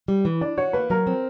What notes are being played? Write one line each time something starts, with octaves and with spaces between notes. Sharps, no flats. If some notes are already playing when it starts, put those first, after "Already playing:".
G3
E3
D4 D5
F#4 C#5
A#3 B4
F#3 A#4
C4